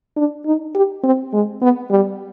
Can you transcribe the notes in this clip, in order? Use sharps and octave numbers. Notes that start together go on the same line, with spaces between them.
D4
D#4
G4
C4
G#3
B3
G3